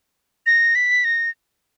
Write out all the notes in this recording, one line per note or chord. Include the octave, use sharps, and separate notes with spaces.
A#6
B6
A#6